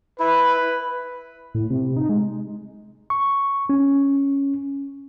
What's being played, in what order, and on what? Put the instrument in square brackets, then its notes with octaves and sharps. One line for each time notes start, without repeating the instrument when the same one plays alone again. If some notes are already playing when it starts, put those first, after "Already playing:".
[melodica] E4 [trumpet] B4
[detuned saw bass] A2
C3
D#4
G#3
[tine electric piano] C#6
C#4